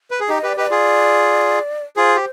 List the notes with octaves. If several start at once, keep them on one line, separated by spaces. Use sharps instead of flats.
B4
G#4
D#4 G4 D#5
G4 B4
D5
G4 B4 D#5
F4 G#4 D5
F4 G#4 C5
G4